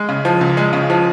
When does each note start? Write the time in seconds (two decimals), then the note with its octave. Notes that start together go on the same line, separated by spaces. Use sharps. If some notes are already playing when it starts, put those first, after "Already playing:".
Already playing: G#3
0.09 C#3
0.25 F3
0.41 C#2
0.57 G#3
0.73 C#3
0.90 F3